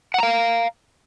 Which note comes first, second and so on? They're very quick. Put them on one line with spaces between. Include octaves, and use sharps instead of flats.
F#5 A#5 F5